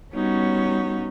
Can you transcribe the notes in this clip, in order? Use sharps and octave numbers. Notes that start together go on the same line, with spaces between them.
G3 B3 C#4 D#4 F#4 C#5